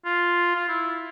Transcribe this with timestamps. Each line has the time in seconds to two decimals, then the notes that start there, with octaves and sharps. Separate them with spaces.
0.05 F4
0.56 F4
0.69 E4